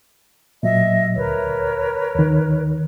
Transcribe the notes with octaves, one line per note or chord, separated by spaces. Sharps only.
A#2 F#3 D#5 E5
D2 A#4 B4 C#5
D#2 D#3